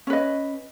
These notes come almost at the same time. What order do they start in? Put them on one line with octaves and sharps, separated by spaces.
C#4 B4 D#5